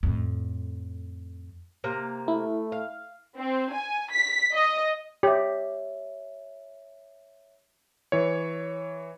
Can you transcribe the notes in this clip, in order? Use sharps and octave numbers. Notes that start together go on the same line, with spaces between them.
F2 A2
C3 A#3 A#5
A3 E4
F5
C4
G#5
B6
D#5
G4 C#5 E5
E3 C#5